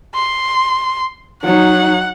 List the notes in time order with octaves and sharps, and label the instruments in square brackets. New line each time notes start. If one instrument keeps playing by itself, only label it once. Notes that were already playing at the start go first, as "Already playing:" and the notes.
[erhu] C6
[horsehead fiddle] F#3 D#4 [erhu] F#5